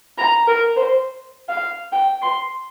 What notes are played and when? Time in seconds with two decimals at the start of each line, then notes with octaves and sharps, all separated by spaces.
0.18 A#5
0.47 A#4
0.76 C5
1.49 F5
1.92 G5
2.22 C6